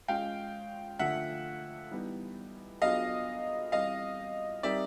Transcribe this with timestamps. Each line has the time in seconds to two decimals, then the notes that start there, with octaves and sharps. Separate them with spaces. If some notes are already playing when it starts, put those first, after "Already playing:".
0.08 G#3 C#4 F4 F5 G5
0.99 D3 F3 A3 E5 F#5
1.91 E3 G3 B3 D#4
2.82 F#3 B3 D4 F4 G#4 D#5 F5
3.72 E3 G3 C4 D#5 F5
4.63 G3 C4 D#4 G4 A#4 D5 E5